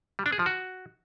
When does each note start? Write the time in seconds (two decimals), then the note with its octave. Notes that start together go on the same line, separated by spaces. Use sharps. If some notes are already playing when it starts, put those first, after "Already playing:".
0.19 G3
0.26 D4
0.33 G#4
0.39 F3
0.46 F#4